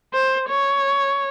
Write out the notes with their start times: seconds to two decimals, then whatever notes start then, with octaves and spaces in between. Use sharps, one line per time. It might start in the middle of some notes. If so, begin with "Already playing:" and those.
0.14 C5
0.50 C#5